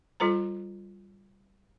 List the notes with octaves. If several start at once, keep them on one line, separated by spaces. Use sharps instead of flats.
G3 F4 A4 C5 A#5